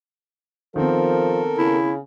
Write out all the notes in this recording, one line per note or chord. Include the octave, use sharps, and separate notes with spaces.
D#3 F3 B3 C4 A4 A#4
C#3 E4